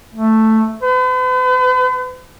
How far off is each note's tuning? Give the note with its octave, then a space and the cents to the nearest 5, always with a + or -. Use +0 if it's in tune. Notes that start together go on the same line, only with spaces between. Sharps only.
A3 +5
B4 +45